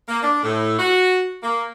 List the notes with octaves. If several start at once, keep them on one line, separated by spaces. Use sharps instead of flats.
A#3
D4
A2
F#4
A#3